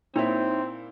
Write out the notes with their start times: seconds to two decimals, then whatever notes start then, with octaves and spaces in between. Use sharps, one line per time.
0.16 A#2 C4 D#4 E4 C#5 E5